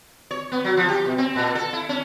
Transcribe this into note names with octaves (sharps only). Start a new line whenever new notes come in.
C#5
B3
F#3
F3
G4
B2
C4
A#2
A4
E4
C#4